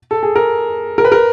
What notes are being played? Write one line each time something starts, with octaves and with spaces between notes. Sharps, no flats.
A4
G#4
A#4
A#4
B4
A#4